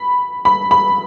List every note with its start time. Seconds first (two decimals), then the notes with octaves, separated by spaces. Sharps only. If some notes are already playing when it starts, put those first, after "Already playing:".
Already playing: B5
0.45 B5
0.71 B5